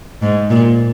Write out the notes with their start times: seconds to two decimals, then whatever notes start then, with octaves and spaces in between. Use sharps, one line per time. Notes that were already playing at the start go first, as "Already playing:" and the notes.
0.22 G#2
0.50 A#2